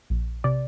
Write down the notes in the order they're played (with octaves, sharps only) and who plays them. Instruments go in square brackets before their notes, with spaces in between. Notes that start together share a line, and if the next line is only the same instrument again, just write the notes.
[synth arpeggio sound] A#1
C3 D5